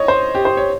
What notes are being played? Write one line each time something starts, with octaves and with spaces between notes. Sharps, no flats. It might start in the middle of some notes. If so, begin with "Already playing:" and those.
Already playing: C#5 D#5
C5
G4
C5
C#5